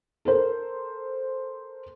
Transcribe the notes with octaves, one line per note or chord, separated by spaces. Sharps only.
A4 A#4 C5